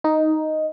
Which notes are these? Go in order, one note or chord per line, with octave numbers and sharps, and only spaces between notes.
D#4